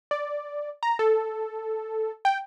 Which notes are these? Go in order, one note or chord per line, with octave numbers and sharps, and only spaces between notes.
D5
A#5
A4
G5